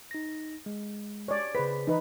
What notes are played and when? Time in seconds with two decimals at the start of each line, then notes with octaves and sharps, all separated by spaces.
0.11 D#4 A#6
0.66 G#3
1.28 C#5 D5
1.55 C#3 G#4 B4 C5 B6
1.87 E3 D#4 B4